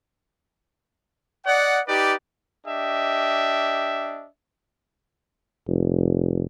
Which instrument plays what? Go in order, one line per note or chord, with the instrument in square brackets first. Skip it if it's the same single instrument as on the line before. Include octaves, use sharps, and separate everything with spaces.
[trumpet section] D5 D#5 F#5
D#4 G4 B4 D5
D4 G4 D#5 E5
[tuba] F1